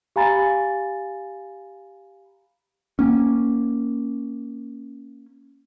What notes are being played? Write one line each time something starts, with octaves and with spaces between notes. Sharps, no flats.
G4 F5 G#5 A#5 B5 A6
A#3 C#4